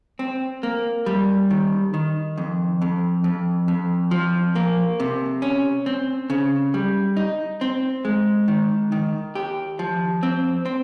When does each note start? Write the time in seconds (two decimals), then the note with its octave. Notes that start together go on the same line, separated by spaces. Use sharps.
0.19 C4
0.63 A#3
1.06 G3
1.50 D#3
1.94 D#3
2.37 F2
2.82 F2
3.24 F2
3.68 F2
4.11 F3
4.55 A#3
5.00 C3
5.42 C#4
5.86 C4
6.30 C#3
6.74 G3
7.17 D#4
7.61 C4
8.05 G#3
8.48 D#3
8.92 D#3
9.35 G4
9.79 F3
10.23 C4
10.66 C4